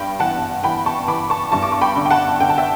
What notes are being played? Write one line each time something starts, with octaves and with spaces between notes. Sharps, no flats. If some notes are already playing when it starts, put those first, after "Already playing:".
Already playing: G2 G5 B5
E3 F#5 A5
E3 G5 B5
A5 C#6
E3 B5 D6
A5 C#6
G2 A5 C#6
D6
C#6
G5 B5
D3
G5
F#5 A5
D3 G5
A5
E5 G5